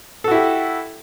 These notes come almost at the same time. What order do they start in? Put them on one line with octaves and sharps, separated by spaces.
A4 F#4 E4 G4